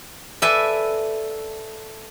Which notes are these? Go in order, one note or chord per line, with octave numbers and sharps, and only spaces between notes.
A4 B4 D5 E5 G#5